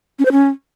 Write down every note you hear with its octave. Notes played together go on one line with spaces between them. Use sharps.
C#4
C5
C#4